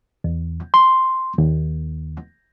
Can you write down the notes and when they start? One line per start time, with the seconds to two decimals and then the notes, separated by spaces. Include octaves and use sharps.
0.24 E2
0.74 C6
1.38 D#2